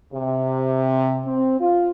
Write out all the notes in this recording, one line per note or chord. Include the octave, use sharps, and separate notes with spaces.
C3
C4
F4